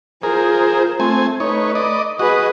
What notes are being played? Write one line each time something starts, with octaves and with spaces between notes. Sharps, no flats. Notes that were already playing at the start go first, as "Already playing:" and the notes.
F4 G#4 A#4 C5
A3 C4 G#5
A3 D#4 B4 C#5
D5 D#5
F#4 G#4 B4 D#5